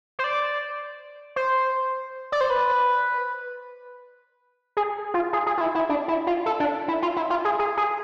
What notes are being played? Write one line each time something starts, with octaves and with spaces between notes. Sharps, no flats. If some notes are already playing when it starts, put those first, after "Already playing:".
C5
D5
C5
D5
C5
B4
G#4
F4
G#4
G#4
F4
E4
E4
D4
E4
F4
A4
D4
E4
F4
E4
F4
G#4
G#4
G#4